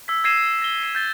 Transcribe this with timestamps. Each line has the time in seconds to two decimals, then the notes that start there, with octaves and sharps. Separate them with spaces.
0.08 E6 G#6 B6
0.24 E6 G#6 A#6 C7 D#7 E7
0.46 E6
0.62 A#6 G7
0.83 C7 E7
0.95 G6 A6 G7